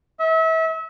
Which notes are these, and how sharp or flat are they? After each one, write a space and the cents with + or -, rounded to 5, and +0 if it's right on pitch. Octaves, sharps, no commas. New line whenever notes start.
E5 -35